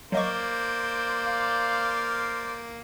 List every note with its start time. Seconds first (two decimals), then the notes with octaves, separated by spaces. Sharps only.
0.12 F#3 A#3 C5 D5 D#5 C#6
1.26 F5